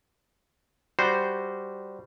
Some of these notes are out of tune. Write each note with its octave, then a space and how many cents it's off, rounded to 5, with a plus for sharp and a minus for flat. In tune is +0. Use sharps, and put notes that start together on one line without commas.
G3 +0 F#4 +0 C5 -10